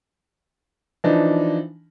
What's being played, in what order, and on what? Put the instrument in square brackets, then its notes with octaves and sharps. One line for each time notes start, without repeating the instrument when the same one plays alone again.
[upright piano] E3 F3 D4 D#4